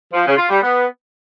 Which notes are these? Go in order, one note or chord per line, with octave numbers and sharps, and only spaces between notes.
F3
C#3
F4
G3
B3